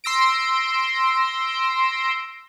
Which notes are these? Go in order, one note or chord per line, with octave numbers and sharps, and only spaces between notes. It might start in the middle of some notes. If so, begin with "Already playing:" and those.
C6 E6 A#6 D7